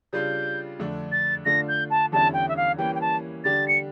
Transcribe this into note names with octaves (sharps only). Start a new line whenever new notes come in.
C#3 G3 D4 F4 G6
F2 D3 A3 D4
A6
D3 A3 D4 F4 A#6
G6
A5
E2 D3 G3 C#4 E4 A5
G5
E5
F5
E3 G3 A#3 C#4 G5
G5
A5
D3 G3 D4 G4 A6
C#7